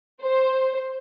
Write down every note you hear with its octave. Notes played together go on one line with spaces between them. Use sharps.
C5